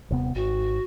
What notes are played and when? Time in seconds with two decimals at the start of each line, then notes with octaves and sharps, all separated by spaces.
0.10 D#1 C3 B3
0.35 G#1 F#4